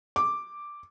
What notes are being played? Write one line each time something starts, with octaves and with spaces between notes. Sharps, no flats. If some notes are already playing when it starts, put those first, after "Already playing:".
D6